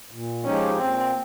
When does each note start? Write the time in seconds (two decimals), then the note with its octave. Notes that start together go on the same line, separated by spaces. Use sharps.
0.11 A#2
0.44 F3 G#3 C#4 D#4 G4
0.79 A#2 C4